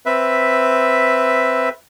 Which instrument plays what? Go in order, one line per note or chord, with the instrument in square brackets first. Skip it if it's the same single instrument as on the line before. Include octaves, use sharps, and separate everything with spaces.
[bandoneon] C4 B4 E5